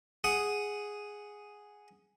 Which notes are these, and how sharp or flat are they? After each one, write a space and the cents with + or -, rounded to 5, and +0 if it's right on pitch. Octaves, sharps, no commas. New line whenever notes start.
G#4 +0 F#5 +0 D#6 +0